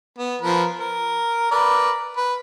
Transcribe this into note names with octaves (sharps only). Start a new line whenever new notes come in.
B3
F3 A#4 B4
A#4
A#4 B4 D5
B4